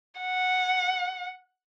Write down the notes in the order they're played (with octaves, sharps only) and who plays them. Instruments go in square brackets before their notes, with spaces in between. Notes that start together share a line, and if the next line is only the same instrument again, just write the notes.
[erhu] F#5